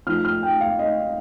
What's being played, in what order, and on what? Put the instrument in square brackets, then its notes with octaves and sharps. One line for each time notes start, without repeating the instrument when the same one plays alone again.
[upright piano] F3 A3 D#4 F6
F6
G5
F5
D#5